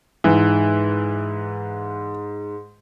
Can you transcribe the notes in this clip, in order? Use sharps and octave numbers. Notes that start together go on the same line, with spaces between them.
G#2 E3